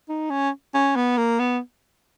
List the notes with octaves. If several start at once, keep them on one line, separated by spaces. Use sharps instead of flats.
D#4
C#4
C#4
B3
A#3
B3